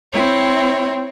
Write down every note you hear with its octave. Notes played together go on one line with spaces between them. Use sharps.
C4 E4 C#5 G5